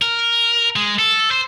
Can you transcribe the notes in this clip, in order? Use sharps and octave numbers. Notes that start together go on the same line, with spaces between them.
A#4
G#3
A4
C5